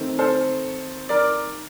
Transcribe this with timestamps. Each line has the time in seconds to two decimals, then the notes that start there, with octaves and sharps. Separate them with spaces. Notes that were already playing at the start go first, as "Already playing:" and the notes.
Already playing: D#3 A3 C4
0.19 A4 C5
1.09 A#4 D5